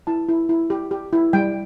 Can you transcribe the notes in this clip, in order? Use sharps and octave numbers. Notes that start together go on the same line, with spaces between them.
E4 A5
E4
E4
G4
G4
E4
G3 G5